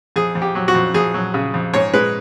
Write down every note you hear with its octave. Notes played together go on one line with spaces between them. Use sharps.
F2 G#4
F2
G4
F#3
F#4
F2
F2 G#4
F#3
C#3
F2
G#2 C#5
G#3 B4